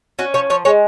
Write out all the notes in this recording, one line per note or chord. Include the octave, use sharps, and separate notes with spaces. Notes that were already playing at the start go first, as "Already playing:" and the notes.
C#4 F#4
F3 C#5
F3 C#5
G#3 C#5